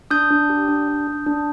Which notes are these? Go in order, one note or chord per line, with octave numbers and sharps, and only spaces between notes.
D4 D#6 G6
D4
G4
D4
D4
D4
D4